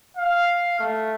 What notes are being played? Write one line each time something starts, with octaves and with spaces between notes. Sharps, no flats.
F5
A3